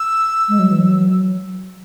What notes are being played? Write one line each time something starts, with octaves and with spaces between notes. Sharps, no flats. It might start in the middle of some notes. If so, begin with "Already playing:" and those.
Already playing: E6
G#3
F#3
E3
F#3